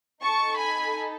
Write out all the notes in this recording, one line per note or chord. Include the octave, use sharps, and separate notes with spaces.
D#4 A4 A5 C#6
G#5 B5